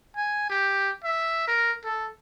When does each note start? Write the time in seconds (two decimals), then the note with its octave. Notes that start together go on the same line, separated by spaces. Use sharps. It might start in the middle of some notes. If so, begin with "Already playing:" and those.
0.16 G#5
0.50 G4
1.04 E5
1.47 A#4
1.84 A4